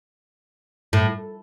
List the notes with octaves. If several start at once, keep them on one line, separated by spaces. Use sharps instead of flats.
A2